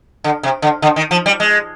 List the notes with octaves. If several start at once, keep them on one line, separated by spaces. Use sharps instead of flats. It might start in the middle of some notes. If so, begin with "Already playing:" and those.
D3
C3
D3
D3
D#3
F3
G3
G#3